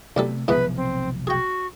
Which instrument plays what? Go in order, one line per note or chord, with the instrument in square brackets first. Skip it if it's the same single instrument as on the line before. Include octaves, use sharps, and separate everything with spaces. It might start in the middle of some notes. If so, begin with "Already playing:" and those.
[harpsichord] B1 G3 A4 [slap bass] C3 A3
[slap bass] F1 B1 F3 [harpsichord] G#2 E3 B3 [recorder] B4
[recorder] C4
[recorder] F#4 [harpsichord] G#4 G5